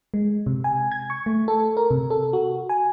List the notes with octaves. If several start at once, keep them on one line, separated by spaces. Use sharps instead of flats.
G#3
C3
G#5
G#6
C#6
A3
A4
A#4
C3
A4
F#4
G#5